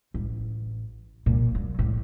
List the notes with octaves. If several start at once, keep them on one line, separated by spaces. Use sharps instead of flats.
A1
A#2
F#3
A2